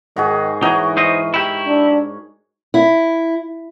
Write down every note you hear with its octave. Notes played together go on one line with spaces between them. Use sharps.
G#2 D#3 F#4 G#4
E3 D#4 F#4 G#4 A#4 C#5
D#4 C5 D#5
E4 G4
D4
E4